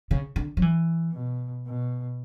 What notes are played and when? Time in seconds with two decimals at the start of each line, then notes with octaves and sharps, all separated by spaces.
0.11 C#3
0.36 D3
0.57 F#3
0.62 E3
1.14 B2
1.67 B2